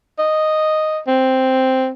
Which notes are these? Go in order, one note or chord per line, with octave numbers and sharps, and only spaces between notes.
D#5
C4